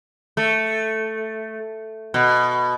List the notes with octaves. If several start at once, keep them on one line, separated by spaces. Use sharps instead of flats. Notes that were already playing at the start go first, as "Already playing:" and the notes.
A3
B2